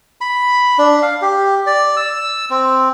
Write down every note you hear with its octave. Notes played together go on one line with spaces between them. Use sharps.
B5
D4
F5
G4
D5
E6
C4